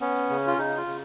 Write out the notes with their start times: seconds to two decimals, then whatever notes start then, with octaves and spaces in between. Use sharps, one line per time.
0.01 B3 C#4
0.30 C#3
0.47 F4
0.58 C#3 D#4
0.77 F4
0.87 C#3